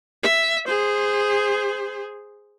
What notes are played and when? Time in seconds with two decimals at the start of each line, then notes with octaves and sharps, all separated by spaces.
0.23 E5
0.68 G#4 C5